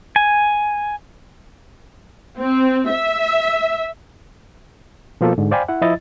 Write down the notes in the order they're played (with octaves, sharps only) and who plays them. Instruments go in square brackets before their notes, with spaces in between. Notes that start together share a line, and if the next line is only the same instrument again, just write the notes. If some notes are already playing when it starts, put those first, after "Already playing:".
[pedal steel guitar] G#5
[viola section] C4
E5
[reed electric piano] B2 F3 A#3 F4 A4
G#2 D3
C5 D5 F5 G5 G#5 B5
E4 F#5
F3 E4 D#5 A6